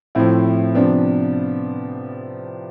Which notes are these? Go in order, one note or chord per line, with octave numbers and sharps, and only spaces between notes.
A2 F3 C4 E4
C3 F3 B3 D4